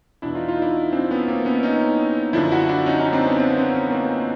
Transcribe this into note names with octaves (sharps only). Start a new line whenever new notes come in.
E2 B2 D4 E4
D#4 F4
D#4 F4
D4 E4
C4 D4
B3 C#4
A#3 C4
B3 C#4
C#4 D#4
F#2 D3 F3 D4 E4
E4 F#4
D4 E4
C#4 D#4
C#4 D#4
C4 D4
B3 C#4
C4 D4
B3 C#4
B3 C#4
A#3 C4